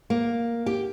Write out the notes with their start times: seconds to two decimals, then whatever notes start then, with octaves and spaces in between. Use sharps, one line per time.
0.10 A#3
0.66 G4